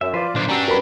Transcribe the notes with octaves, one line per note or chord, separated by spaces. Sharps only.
F#2 E5
F3 F4 B4 C5 D5
B1 A#2 D3 D4 C5
G2 G3 C#4 D4 F#4 G4 A#5 E6
F#3 C#4 A#4 B4 B5